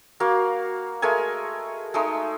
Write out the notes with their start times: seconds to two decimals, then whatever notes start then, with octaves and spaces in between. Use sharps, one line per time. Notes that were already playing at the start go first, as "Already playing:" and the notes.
0.20 A#3 F#4 F5
1.02 G#3 A3 A#4 G#5
1.94 G#3 A3 D#4